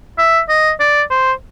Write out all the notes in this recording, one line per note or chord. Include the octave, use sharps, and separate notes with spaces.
E5
D#5
D5
C5